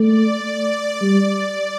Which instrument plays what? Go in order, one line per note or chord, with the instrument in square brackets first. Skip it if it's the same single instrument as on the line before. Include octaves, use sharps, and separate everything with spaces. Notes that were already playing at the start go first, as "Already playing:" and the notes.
Already playing: [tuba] A3 [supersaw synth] D5
[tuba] G3